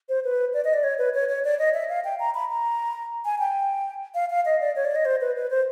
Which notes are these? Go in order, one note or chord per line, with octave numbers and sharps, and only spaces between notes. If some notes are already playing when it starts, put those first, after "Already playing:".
C5
B4
D5
D#5
D5
C#5
B4
C#5
C#5
D5
D#5
E5
F5
G5
A#5
B5
A#5
G#5
G5
F5
F5
D#5
D5
C#5
D5
D#5
C5
B4
B4
C5